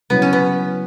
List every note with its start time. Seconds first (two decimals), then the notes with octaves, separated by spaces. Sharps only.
0.10 C#3 F#3 B3 E4 C#5
0.22 C#4
0.33 B3